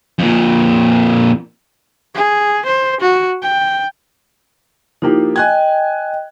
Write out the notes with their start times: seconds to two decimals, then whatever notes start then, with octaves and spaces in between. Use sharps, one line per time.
0.19 F2 A#2
2.15 G#4
2.65 C5
3.01 F#4
3.42 G5
5.02 F3 A#3 D#4 E4 G4
5.36 D#5 G5 G#5 F#6 G#6